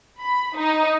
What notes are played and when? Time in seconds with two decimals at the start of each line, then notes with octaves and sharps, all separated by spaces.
0.21 B5
0.57 D#4